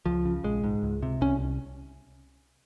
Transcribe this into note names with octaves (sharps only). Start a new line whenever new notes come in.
C#2 F3
C#3
A#1 G#3
G#2
C#2
C3
C2 C#4